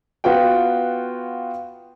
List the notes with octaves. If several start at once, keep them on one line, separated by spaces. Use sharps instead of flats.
B3 F4 F#4 F#5 G5